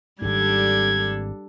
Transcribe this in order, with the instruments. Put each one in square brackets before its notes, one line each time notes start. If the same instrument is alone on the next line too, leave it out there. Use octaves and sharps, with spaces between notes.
[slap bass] G#1 G#2 [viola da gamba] G3 D4 A4 [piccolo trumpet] G#6